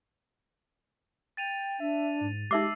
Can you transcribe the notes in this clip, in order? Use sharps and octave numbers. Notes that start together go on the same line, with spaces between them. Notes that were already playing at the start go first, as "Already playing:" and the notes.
G5 A6 D#7 F7
D4 E5
G#2
G#3 D#4 G4 E5 D6 E6 C7